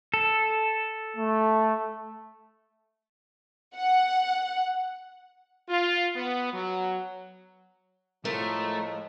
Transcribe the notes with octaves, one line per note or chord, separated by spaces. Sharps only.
A4
A3
F#5
F4
B3
F#3
A2 F3 G#3 A3 A#4